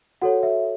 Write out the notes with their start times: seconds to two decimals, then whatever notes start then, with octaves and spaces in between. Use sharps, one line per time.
0.22 F#4 A4 C#5 F#5
0.43 E5